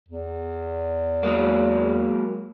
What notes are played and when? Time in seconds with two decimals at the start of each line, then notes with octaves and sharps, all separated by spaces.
0.08 E2
1.23 F#3 G#3 A#3